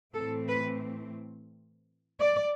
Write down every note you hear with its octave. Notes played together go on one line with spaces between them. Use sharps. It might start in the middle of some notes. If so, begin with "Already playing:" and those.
A2 E3 A3 C4 A4
B4
D5